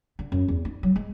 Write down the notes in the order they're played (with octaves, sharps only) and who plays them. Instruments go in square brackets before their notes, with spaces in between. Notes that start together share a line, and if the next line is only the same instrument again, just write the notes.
[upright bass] D3
F#2
E2
D#4
F#3
G#3